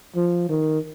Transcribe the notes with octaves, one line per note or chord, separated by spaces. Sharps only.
F3
D#3